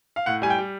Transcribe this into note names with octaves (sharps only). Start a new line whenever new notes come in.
F5
A2 F#5
G3 G#5
G5
G3